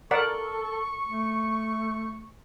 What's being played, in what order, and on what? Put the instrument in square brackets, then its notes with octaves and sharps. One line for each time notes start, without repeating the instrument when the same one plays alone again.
[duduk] A4 [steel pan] A#4 D5 F#5 [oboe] C#6
[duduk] A3